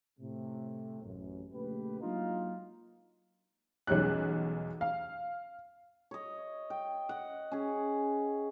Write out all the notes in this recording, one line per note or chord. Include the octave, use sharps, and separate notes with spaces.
A2 C3 A3
A1 F#2
A#1 C#3 A3 A#3 G4 B4
F#3 G#3 A#3 D4 D#4 F4
B1 E2 G3 C#4 F#6
F5
C#5 D#5
G5
D#5 F#5
C#4 G#4